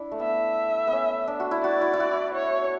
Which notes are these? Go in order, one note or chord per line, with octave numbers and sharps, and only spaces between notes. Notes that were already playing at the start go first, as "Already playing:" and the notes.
Already playing: D4 E4
A3
B3 E5
B3
C#4
D4
F#4
E4
F#4 D5
E4
E4
F#4
C#5